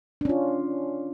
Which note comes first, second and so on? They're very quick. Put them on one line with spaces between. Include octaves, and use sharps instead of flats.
D4 C#4 F4